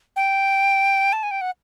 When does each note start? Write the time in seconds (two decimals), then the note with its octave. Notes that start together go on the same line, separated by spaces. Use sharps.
0.16 G5
1.13 A5
1.23 G#5
1.31 G5
1.41 F#5